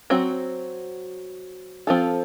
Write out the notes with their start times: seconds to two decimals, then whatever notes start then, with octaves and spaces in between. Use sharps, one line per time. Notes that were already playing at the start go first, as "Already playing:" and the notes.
0.10 F#3 C4 F#4
1.87 F3 C4 F4 A4